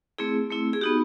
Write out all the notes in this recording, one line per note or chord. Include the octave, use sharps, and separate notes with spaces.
A3 C4 E4 G#4
A3 C4 E4
G#4
B3 D#4 F#4 G4